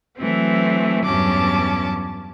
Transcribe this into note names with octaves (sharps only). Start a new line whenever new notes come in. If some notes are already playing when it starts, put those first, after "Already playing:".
E3 F#3 A3 C4
E2 G2 F#3 C#4 A5 D6